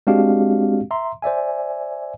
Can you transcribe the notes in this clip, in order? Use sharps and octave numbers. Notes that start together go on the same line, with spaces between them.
G#3 C4 D4 F#4 G4 F5
E5 A#5 C6
C5 D5 E5 G#5